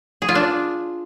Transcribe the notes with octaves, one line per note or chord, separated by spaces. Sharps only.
G#4
F4
D4